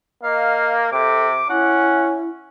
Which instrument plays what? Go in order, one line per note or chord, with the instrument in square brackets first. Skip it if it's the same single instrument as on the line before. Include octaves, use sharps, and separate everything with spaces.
[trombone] A#3 [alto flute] D#5 [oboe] F5
[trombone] C3 [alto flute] A4 [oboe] D6
[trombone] C#4 [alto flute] E4 [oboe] F#5